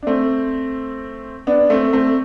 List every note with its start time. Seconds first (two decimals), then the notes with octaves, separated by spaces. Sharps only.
0.03 D4
0.07 A3 C4
1.47 B3 D4
1.70 A3 C4
1.93 A3 C4